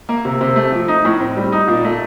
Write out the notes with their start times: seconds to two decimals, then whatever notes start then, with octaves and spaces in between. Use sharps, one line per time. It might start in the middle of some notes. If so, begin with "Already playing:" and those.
0.09 A#3
0.25 C3
0.41 C3
0.56 A3
0.72 F3
0.88 D#4
1.05 A2
1.20 C4
1.37 G3
1.52 D#4
1.68 A#2
1.84 A3